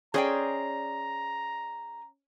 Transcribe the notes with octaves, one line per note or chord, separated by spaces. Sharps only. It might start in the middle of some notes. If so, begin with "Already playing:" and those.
C#4 G#4 C5 D5 D#5 G5 A#5